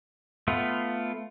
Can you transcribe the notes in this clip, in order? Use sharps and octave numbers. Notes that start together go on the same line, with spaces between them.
A3 B3 F4